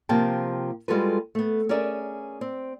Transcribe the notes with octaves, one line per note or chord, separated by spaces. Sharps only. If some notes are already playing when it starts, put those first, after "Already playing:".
C3 F3 A#3 F4 G5 A5
G3 G#3 F4 F#4 A4 B4
A3 B3
C#4 G#4 A#4 D5 E5
C4